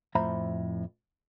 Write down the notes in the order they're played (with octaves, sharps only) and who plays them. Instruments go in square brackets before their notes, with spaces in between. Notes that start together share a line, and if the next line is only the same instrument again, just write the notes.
[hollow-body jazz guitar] F2 A2 C5 E5 A#5 B5